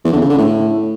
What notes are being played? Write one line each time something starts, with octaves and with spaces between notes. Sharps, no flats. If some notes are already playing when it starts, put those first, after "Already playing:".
E2
D3
C#3
D3
A2